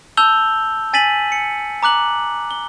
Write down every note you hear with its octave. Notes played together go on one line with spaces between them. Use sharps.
A5 E6 G6 F7 G7
G#5 A6 B6 D#7 F#7
C#7
A#5 D6 F#6 F#7
G7